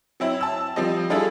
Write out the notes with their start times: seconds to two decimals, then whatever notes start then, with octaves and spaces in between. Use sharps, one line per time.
0.20 F#3 C4 E4
0.41 A5 E6
0.76 F3 G3 C4 D#5
1.10 G3 D4 E4 F4 G#4 A4